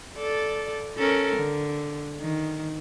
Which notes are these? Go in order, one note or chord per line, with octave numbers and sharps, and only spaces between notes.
A4 D5
C#4 A4 A#4
D3
D#3